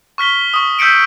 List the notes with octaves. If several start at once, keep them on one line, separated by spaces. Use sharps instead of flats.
C#6 F6 B6 G7
C#6 D#6
E6 G6 B6 C#7 D7